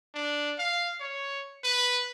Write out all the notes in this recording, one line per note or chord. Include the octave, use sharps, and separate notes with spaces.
D4
F5
C#5
B4